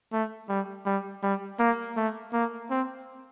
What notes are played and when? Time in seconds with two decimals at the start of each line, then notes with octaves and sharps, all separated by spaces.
0.13 A3
0.49 G3
0.86 G3
1.23 G3
1.59 A#3
1.97 A3
2.33 A#3
2.70 C4